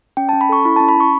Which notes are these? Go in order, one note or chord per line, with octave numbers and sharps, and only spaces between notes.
C#4 G5
C#4 A5
B5
A4 C#6
E4 B5
C#4 A5
B5
C#4 C#6